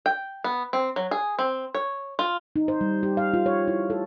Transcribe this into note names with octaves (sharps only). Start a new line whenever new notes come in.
G5
B3
C4
F#3
G#4
C4
C#5
F4
D#4
C5
G3
G4
F5
F4
C#5
E4
A4